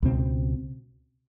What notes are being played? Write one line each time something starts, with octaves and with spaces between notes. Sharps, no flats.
C#2 B2 G3 C4